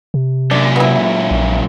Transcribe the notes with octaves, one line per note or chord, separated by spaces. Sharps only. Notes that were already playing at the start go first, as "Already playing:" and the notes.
C3
F#2 A#2 D4
B3 E4
A#1